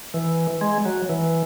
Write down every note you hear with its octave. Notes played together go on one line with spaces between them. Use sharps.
E3
G#3
F#3
E3